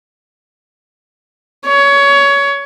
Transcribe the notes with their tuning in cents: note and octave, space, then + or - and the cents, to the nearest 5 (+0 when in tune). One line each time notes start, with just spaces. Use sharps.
C#5 +20